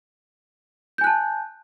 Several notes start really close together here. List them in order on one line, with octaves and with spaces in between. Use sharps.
G6 G#5 F#6 A5